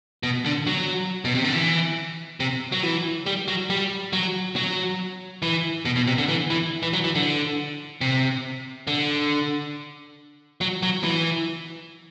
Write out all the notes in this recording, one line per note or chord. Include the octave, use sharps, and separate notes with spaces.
B2
D3
F#3
B2
C3
D3
E3
C3
F#3
E3
G3
F#3
G3
F#3
F#3
E3
B2
B2
C3
D3
E3
E3
E3
F#3
E3
D3
C3
D3
F#3
F#3
E3